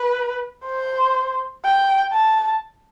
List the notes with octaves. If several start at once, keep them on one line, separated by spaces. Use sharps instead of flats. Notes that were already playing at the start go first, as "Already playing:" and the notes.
Already playing: B4
C5
G5
A5